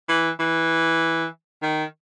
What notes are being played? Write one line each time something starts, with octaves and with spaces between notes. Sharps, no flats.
E3
E3
D#3